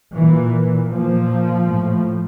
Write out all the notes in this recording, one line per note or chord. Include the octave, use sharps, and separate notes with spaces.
A#2 E3
A#2 F3
A2